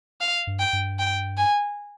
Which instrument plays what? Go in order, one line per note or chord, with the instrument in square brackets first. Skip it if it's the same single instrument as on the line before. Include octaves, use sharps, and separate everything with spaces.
[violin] F5
[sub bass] G2
[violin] G5
[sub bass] G2
[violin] G5
G#5